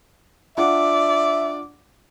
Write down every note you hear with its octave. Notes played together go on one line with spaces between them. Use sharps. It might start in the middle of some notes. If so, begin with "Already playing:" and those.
D4 F4 D5 E5 F#5